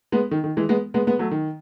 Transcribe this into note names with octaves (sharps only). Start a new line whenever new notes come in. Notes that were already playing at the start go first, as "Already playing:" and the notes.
G#3 B3
D#3
D#3
E3 G#3
G#3 B3
G#3 B3
G#3 B3
F#3 A3
D#3